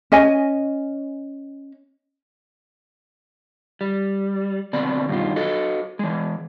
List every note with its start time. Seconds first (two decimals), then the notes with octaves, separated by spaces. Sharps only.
0.12 C#4 D#5 G#5
3.81 G3
4.73 B2 D3 C4 D5
5.09 G2 B2 D#3 F4
5.36 F#4 A4 D#5
5.99 E3 G#3